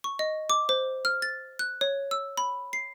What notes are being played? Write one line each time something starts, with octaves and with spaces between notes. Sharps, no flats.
C#6
D#5
D6
C5
F6
A6
F#6
C#5
E6
B5
C7